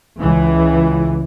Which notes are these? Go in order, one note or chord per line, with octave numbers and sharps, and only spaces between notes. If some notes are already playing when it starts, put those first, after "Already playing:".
C#2 E3